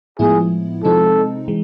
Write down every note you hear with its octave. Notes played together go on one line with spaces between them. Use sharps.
A2 F3 G#3 B3 E4 G#4
C3 F3 G#3 C4 D#4 A4
E3 G#3